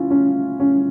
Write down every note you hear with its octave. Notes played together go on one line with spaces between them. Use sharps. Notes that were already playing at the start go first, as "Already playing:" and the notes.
Already playing: A#2 C#4 E4 F4
C#4
C#4